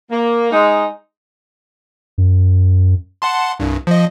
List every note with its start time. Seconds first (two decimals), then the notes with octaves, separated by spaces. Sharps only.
0.10 A#3
0.51 G#3 D#4
2.18 F#2
3.22 F#5 A5 C6
3.60 C2 G2
3.87 F3 D#5